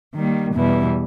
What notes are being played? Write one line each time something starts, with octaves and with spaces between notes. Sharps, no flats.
D#3 G3 A#3
E2 B2 G3 B3 E4